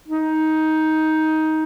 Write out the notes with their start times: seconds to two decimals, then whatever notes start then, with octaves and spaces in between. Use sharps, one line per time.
0.08 D#4